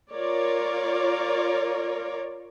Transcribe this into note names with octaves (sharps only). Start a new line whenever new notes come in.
F4 A#4 C#5 D5